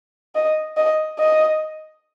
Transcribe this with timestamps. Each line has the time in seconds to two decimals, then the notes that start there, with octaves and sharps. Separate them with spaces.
0.35 D#5
0.77 D#5
1.19 D#5